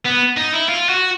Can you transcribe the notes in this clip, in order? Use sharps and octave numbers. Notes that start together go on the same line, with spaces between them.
B3
D#4
E4
F4
F#4